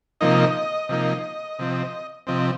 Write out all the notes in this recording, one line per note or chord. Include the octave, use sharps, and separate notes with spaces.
C3 F3 A#3 D#4 D#5
C3 F3 A#3 D#4
C3 F3 C4
C3 F3 C4 D#5